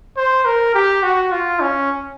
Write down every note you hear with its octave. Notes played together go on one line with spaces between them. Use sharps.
C5
A#4
G4
F#4
F4
C#4